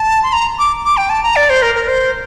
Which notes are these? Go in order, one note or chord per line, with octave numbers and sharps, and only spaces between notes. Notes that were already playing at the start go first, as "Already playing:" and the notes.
Already playing: A5
C6
A#5
D6
D6
G5
A5
A#5
D5
C5
A#4
A#4
C5